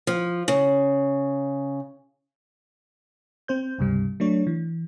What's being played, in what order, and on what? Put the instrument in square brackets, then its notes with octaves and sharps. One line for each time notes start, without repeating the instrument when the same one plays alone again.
[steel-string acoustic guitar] F3
C#3
[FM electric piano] C4 C5 G6
C#2 G2 C3 G3
F#3 A3 D4 C#5
E3